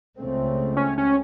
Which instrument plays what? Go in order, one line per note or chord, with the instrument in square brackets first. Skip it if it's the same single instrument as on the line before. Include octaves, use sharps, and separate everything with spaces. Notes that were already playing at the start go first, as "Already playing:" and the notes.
[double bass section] C#2 C#3 A3 C4
[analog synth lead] C#4
C#4